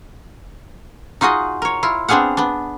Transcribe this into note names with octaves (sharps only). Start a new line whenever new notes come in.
D#4 F4 F#4 G#4 D#5
A#4 C#5
E4 F4
B3 C4 D4 G#4 F5 F#5
B3 D4